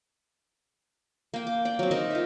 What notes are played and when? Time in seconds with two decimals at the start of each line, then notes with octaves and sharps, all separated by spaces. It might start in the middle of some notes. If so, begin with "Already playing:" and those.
1.34 A#3 G5
1.47 D6
1.65 D5 G5
1.79 F#3 C4
1.91 D#4 A#4 D#5
2.10 F4 E5